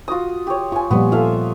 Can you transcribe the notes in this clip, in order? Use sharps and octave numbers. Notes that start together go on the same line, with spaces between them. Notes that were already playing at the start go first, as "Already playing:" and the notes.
F4 F#4 D#6
G4 C#5
F4 G#5 C#6
A#2 F3 G3 B3
F4 A4 E5 F5